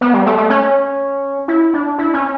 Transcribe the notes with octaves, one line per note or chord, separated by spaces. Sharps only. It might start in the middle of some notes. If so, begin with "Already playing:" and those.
B3
G3
A3
A3
C#4
E4
D4
E4
C#4